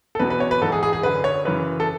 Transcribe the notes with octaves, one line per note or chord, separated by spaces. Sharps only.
A4
E2 B2 B4
B4
C#5
B4
G#2 E3 A4
G#4
G#4
G#4
F#2 D3 B4
C#5
F#2 C#3 E3 B4
A4